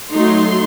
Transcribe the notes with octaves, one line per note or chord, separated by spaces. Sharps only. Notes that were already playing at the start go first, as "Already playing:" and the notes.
F#3 A3 D#4 C6